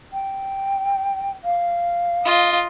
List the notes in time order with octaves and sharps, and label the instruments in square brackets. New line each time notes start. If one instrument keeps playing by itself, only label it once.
[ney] G5
F5
[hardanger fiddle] F4 D#5